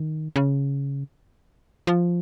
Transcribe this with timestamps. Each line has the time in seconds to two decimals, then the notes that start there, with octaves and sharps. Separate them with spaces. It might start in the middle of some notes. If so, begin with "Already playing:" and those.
Already playing: D#3
0.36 C#3
1.87 F3